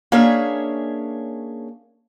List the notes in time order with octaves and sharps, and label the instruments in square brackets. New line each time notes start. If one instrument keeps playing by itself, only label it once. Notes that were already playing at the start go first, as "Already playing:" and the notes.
[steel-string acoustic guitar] A#3 C#4 D4 G#4 C#5 E5